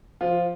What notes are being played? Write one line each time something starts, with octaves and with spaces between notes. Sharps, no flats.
F3 F4